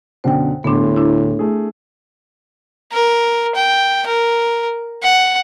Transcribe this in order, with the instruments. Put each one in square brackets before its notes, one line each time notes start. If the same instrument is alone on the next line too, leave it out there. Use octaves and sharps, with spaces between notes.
[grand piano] F#2 B2 D3 [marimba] C5 G5
[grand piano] D1 C6 [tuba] A2 [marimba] B3 D4
[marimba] D4 E4
[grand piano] A3 G#4
[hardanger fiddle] A#4
G5
A#4
F#5